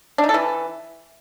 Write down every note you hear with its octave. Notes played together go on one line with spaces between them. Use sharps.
D4
D#4
A4
E3